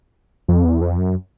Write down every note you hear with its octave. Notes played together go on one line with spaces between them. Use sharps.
F2
E2
F2
F#2